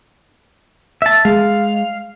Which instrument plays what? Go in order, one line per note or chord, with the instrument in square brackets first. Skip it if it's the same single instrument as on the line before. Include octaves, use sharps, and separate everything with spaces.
[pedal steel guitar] E5 A5
[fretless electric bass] G#3 [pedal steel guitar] F5